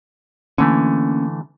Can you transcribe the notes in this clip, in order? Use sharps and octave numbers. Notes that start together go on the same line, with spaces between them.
D3 E3 A3 A#3 C#4